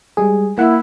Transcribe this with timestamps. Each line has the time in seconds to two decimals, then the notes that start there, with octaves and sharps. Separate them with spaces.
0.17 G3 G#3 G#4
0.58 A#3 E4 F#5